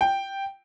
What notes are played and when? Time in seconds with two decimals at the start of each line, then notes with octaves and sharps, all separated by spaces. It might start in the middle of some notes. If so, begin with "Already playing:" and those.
0.01 G5